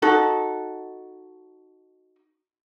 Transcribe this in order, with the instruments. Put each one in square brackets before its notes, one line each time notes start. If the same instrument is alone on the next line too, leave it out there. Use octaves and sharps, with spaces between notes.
[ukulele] D#4 F#4 A4